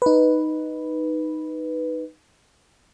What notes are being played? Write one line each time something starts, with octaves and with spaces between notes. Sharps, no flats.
D#4 B4